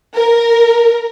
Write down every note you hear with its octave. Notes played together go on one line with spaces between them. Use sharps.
A#4